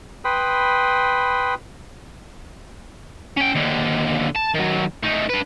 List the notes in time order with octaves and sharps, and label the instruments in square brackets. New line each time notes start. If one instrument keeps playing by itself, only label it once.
[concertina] B4 G5 B5 C6 D#6
[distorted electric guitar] C#4 G5
D#2 D3
A5
D#3 F#3
A3 D#4
D4 B4